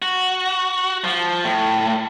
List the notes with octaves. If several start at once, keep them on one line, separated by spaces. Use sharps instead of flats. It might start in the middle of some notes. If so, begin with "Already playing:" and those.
F#4
F3
A2